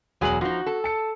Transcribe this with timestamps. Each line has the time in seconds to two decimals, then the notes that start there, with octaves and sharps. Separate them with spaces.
0.21 E1 E2 F#3 G#4 F#7
0.41 F3 D#4 F#4
0.66 A4
0.84 A5 C#7